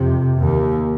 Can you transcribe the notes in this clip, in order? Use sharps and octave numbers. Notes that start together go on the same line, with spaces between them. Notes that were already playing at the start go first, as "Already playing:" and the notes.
Already playing: F2 C3
D#2